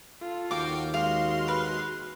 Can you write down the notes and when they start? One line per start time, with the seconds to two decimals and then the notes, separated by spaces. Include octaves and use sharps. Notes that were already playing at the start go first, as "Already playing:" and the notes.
0.21 F4 A4
0.51 D#2 F#4 F5 G5 D6
0.94 G#3 F#4 F5 C6 F6
1.48 B4